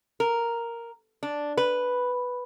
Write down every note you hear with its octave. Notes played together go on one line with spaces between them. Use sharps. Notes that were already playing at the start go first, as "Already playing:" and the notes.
A#4
D4
B4